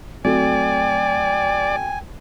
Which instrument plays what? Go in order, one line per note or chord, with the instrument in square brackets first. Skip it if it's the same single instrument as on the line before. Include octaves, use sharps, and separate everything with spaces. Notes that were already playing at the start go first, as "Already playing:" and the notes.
[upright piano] F#3 A3 C4 [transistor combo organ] D5 [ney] G5 [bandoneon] G#5